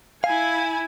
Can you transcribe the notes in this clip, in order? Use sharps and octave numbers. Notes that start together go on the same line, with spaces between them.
E4 F5 G#5